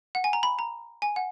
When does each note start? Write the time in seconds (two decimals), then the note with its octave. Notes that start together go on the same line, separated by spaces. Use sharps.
0.15 F#5
0.24 G#5
0.33 A#5
0.43 B5
0.59 A#5
1.02 G#5
1.16 F#5